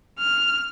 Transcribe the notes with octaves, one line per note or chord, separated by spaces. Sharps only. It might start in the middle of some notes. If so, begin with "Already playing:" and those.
F6